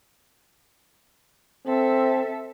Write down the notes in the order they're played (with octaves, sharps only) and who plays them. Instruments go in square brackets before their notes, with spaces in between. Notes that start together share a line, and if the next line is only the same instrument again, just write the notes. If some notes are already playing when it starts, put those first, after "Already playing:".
[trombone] C4 [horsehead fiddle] A4 E5